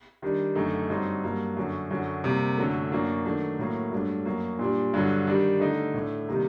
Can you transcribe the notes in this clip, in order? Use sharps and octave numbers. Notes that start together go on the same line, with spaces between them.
D#3 G3 D4
F#2 D3 A3 D#4
G2 F#3 C4 D#4
G2 F#3 A#3
F#2 D3 F#3
F#2 D3 F#3
C3 G3 A#3
F#2 D3 F#3 A3
F#2 F#3 A#3 D4
D#3 F#3 A3 D4
A2 F#3 A#3
G2 F#3 A3 D4
F#2 F#3 A#3
A#2 G3 D4
G2 D3 F#3
D#3 G3 D4
D3 A3 D#4
A2 A3 D4
C3 D#3 G3 A#3